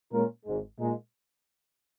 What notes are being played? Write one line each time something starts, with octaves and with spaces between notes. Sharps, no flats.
A#2 G#3 C#4 F4 A#4
G#1 G#2 G#3
A#2 G#3 D#4